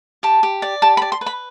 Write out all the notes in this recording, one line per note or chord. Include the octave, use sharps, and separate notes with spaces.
G4 A5
G4
D5
G4 A5
B5
D5
C6
B4
B5